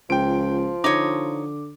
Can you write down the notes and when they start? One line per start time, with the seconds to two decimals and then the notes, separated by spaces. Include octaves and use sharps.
0.10 C#2 F3 G5 D7
0.84 D3 D#4 C#5 D6